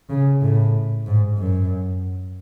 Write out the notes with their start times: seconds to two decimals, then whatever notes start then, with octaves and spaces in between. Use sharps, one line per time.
0.09 C#3
0.41 A2
1.06 G#2
1.38 F#2